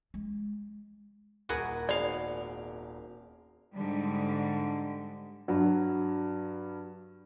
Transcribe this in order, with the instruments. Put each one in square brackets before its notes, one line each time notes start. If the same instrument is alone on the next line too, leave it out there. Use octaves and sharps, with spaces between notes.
[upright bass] G#3
[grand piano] D#1 A#4 [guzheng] F#4 G#4 B4
[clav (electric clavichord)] G#1 F5 [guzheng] B3 [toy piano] D5
[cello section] G#2 D3 G3
[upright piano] G2 F#3